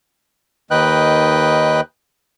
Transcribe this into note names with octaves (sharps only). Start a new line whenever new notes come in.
D#2 D#3 B4 D#5 G5 F#6